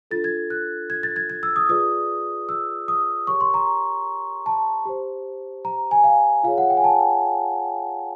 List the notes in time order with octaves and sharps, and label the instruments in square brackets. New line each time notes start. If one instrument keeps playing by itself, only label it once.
[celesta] D4 F4 A4 A6
G#6
F#6
G#6
A6
G#6
G#6
E6
D#6
F4 G#4 B4 D5 D#6
E6
D#6
G4 A#4 C#5 C#6
C6
A#5
A5
G4 C5
A#5
G#5
F5
F4 G#4 C#5 F5
F#5
G5
G#5
A5